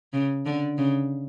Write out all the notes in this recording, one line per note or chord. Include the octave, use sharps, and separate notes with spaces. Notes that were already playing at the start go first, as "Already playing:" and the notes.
C#3
D3
C#3